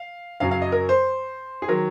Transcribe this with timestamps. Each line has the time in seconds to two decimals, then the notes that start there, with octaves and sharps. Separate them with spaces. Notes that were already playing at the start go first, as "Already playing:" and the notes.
Already playing: F5
0.40 F#2 C#3 F#3 F5
0.51 F5
0.62 D#5
0.72 A#4
0.89 C5
1.62 G#4
1.68 D#3 F#3 A#4